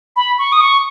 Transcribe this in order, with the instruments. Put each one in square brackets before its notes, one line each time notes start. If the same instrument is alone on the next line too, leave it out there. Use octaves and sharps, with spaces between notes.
[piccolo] B5
C#6
D#6
C#6